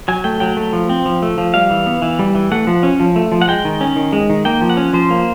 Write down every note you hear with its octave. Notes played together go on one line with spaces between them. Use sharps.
F#3 G#5
A3 G5
F#3 G5
A3
F3
C4
F3
A3
F3
G3 F5
E3
B3
E3
G3
E3
A3 F#5
F3
C#4
F3
A3
F3
F#5
G#3 G5
D#3
C#4
D#3
G#3
D#3
A#3 G5
F3
F#5
C#4
F3 C5
A#3